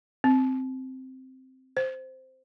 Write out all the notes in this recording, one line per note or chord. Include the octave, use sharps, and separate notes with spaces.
C4
C5